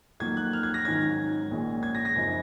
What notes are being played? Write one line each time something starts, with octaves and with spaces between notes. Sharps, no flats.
F2 D#3 F#3 A#3 G#6
F#6
F6
G#6
A#6
G#1 G#2 D#3 F#3 C#4 G#6
A#1 A#2 G#3 C#4
G#6
A#6
A#6
F#2 C#3 F3 C4 D#4